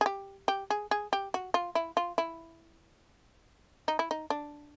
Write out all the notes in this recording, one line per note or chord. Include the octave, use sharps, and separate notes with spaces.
G#4
G4
G4
G#4
G#4
G4
F#4
F4
E4
F4
E4
D#4
E4
D#4
D4